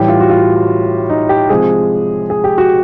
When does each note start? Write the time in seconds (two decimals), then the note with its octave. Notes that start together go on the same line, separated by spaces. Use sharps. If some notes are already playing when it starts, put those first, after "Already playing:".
Already playing: A2 E3 G3 G4
0.08 F4
0.20 F#4
0.30 F4
1.10 D#4
1.29 G4
1.49 C3 F3 G#3 G#4
2.30 G#4
2.44 G4
2.58 F#4